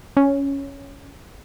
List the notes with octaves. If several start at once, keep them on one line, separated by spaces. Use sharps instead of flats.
C#4